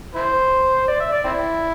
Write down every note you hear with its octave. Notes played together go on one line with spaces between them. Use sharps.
E4 C5
D5
E5
D5
C4 E4